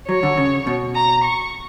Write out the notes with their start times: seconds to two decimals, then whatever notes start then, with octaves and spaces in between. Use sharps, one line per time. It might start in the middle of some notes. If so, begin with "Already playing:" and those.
0.09 F#3 C#5
0.23 D3
0.37 C#3
0.67 B2
0.95 A#5
1.24 C#6